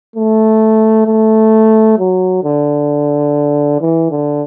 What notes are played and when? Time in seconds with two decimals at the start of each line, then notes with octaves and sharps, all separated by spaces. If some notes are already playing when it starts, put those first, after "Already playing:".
0.16 A3
1.07 A3
1.99 F#3
2.44 D3
3.81 E3
4.11 D3